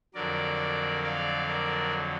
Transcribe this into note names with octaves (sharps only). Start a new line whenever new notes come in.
F2 D3 F#3 A#4 D5
D5 F5
A#4 D5